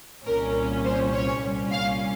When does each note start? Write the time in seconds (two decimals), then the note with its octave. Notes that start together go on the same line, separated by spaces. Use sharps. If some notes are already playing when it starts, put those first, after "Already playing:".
0.25 C2 A#2 G3 C#4 A#4
0.84 C5
1.13 C#5
1.42 C2 A#2 G3 C#4
1.71 F5